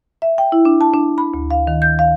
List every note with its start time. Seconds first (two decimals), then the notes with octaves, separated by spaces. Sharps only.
0.22 E5
0.38 G5
0.52 E4
0.65 D4
0.81 A5
0.94 D4
1.18 B5
1.34 D2
1.51 F5
1.67 D#3
1.82 G6
1.99 F5